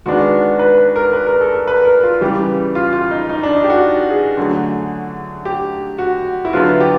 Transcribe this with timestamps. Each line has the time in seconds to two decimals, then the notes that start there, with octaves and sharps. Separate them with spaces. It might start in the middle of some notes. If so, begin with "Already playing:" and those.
0.06 D#3 G#3 B3 D4 F#4
0.59 B4
0.78 B4
0.96 A#4
1.13 B4
1.27 A#4
1.41 A4
1.54 A#4
1.68 B4
1.85 A#4
2.03 F4
2.21 C#3 E3 G3 G4
2.75 F4
2.93 F4
3.11 D#4
3.29 D#4
3.43 D4
3.56 D#4
3.64 G4
3.70 F#4
4.10 G#4
4.37 D3 F#3 A3
5.45 G4
5.98 F#4
6.45 E4
6.53 D3 F#3 B3 F4
6.80 G4